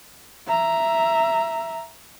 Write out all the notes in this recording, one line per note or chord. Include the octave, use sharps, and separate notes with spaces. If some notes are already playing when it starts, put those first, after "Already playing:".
E5 A#5